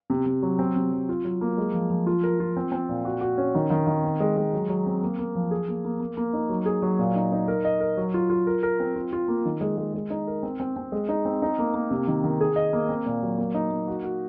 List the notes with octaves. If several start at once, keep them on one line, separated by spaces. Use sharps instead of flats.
C3
C3
F#3
C4
C3
F#3
F4
F#3
A#3
G#3
F3
F3
F4
A#4
F4
C4
C4
A#2
F#4
F#4
C#4
D#3
D#3
D#3
C4
G#3
G#3
F#3
F#3
C4
A#3
A#3
F3
G#4
A#3
A#3
A#3
A#3
D#4
F#3
G#4
F#3
A#2
D#4
D#4
A#4
D#5
A#4
F#3
F4
F4
A#4
A#4
C4
F4
F4
A#3
D#3
G#3
G#3
G#3
D#4
A#4
C4
C4
C4
G#3
D#4
C4
D#4
A#3
A#3
C3
D#3
D#3
G#4
D#5
A#3
C4
A#2
F#3
A#3
D#4
A#3
F#4
F#4